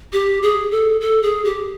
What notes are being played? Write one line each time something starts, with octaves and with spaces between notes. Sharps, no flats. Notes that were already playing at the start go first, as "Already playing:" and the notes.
G4
G#4
A4
A4
G#4
G4